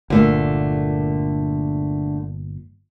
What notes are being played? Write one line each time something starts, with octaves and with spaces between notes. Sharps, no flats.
G1 A#2 D3 A3 A#3